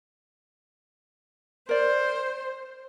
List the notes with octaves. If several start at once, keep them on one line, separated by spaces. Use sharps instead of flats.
A#4 C5 D5